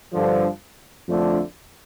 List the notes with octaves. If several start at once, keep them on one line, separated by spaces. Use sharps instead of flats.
G2 D3 F3
F2 D3 F3 A3 D4